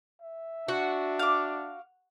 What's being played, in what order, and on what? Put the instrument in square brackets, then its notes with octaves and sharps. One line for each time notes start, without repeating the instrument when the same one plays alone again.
[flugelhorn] E5
[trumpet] D4 [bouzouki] F#4
[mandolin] F5 D6